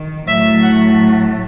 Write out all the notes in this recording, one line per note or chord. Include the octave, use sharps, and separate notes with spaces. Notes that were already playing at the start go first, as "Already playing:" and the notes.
Already playing: D#3
A2 F#3 A3 E5
F#5